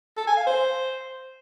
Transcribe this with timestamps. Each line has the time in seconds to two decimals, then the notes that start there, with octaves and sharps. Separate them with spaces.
0.17 A4
0.27 G#5
0.37 F5
0.47 C5